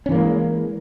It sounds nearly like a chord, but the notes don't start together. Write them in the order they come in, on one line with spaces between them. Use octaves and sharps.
C#4 E3 A#3 G#3